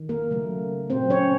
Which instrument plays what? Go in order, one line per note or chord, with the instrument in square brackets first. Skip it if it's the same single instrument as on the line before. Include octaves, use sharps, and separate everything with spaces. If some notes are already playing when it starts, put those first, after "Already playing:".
Already playing: [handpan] D#3
A#3 A#4
C#3 F#3 A3
A#2 F#3 A#3 C4 C5
C#4 C#5